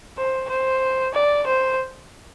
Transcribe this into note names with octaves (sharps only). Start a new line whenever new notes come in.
C5
C5
D5
C5